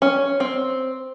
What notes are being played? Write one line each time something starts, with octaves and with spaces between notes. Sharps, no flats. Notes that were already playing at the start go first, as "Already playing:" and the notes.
C#4
C4